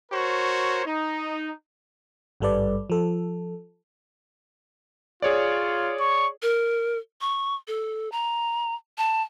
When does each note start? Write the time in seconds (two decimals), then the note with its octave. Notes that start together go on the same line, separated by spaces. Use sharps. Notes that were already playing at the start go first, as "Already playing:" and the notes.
0.12 F#4 A#4 C5 C#5
0.86 D#4
2.40 G#1 G2 G3 A4 B4 D5
2.90 F3 A4
5.22 F4 G#4 C#5 D5
6.00 C#6
6.42 A#4
7.21 C#6
7.68 A4
8.12 A#5
8.98 A5